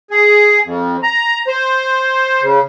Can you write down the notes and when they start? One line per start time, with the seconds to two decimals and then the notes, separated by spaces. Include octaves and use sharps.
0.11 G#4
0.64 F2
1.03 A#5
1.47 C5
2.42 C#3